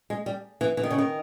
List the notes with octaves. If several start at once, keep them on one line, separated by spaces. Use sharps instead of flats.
G#3
G3
E3
E3
D#3
C#3
D#3